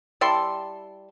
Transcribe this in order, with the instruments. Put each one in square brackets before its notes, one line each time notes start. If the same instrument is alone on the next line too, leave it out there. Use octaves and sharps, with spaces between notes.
[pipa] G3 E4 A5 C6